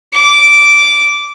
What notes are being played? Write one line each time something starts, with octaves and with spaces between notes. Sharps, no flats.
D6